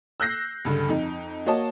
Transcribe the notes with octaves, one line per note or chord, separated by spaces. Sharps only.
E6 F#6 G6 A#6 C7
C#2 G2 D3
F2 D#4
A#3 F#4 C#5 D#5 A5